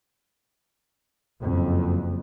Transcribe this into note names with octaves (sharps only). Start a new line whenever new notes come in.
F#1 F2